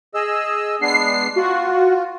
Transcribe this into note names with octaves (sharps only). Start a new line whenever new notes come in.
G#4 D#5 E6
G#3 B3 D4 C7
F4 F#4